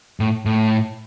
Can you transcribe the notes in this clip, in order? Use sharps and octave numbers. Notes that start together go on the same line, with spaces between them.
A2
A2